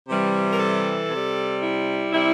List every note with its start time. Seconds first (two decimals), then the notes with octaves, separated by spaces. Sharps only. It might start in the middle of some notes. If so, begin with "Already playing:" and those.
0.09 C3 E3 G3
0.53 A#4
0.59 A4
1.11 C3 G3
1.62 E4
2.13 C3 G3 E4